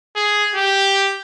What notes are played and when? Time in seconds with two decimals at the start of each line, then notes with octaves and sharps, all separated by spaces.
0.16 G#4
0.56 G4